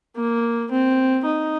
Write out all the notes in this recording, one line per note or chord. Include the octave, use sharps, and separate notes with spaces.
A#3
C4
D#4